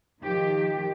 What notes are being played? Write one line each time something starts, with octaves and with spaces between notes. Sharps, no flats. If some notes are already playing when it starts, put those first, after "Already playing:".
D#3 F3 G4